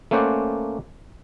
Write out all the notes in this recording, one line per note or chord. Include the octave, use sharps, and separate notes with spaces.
A3 A#3 C#4 C5 D5 F#5